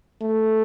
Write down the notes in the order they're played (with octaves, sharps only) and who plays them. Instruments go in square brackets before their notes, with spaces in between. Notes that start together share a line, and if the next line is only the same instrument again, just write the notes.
[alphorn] A3